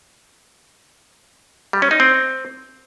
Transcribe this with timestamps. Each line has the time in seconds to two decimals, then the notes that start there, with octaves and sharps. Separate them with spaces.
1.73 G3
1.82 C#4
1.91 D#4
2.00 C4